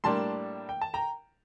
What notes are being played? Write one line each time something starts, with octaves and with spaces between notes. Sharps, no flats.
A2 G3 A#3 D4 A5 C6
G5
A5
G5 A#5